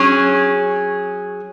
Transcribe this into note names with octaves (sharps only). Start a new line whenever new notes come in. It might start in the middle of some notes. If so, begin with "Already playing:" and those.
Already playing: F#3 C#4 G#4